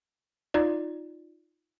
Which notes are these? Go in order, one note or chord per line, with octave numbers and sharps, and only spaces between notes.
D#4 F4 D5